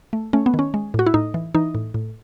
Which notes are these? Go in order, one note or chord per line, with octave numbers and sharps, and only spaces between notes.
A3
A3 C#4
B3
D#3
C#4
G#3
A2 F#4
E4
A2 D#4
E3
E3 D#4
A2
A2